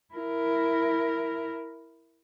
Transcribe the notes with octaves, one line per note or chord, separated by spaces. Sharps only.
E4 A#4